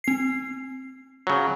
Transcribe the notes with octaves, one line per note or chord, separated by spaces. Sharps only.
C4 C7
C#3 F#3